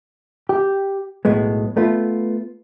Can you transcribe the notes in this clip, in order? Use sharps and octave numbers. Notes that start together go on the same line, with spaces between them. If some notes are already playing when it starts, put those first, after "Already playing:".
G4
B1 A2 G#3 B3
A3 B3 F4